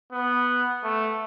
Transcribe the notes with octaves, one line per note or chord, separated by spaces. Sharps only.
B3
A3